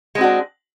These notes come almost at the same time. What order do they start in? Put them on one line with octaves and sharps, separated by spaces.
G#3 C4 F#4 D4